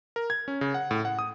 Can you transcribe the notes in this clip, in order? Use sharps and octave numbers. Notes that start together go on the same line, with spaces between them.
A#4
G#6
C#4
C#3
F#5
A2
F#5
D#6